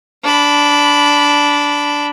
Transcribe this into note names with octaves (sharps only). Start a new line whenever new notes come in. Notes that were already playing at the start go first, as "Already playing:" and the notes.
D4 B5